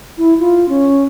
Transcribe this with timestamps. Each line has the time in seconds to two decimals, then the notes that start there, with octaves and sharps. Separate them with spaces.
0.18 E4
0.39 F4
0.69 C#4